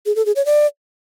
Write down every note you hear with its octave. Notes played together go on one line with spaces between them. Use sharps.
G#4
A4
G#4
C#5
D5